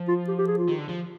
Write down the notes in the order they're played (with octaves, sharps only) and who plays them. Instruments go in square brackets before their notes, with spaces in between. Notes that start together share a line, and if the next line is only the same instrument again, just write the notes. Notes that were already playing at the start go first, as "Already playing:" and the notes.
Already playing: [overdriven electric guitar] F3
[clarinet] F4
G4
G4
G#4
F4
[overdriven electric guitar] D#3
D3
F3